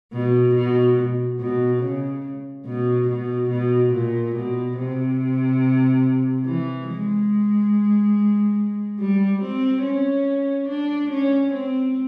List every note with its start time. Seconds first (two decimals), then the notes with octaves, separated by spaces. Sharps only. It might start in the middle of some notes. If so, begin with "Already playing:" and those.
0.13 B2
0.55 B2
1.40 B2
1.82 C#3
2.65 B2
3.08 B2
3.50 B2
3.92 A#2
4.35 B2
4.77 C3
6.45 E3
6.88 G#3
9.00 G3
9.42 C4
9.83 C#4
10.68 D4
11.10 C#4
11.52 C4